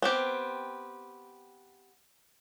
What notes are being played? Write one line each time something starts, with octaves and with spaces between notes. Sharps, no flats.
B3 C4 G4